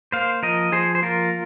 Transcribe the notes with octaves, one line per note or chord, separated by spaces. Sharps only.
A#3 C5 F5
F3 A#4 D#5
F3 G#4 C5
C5
A#3 F4 A#4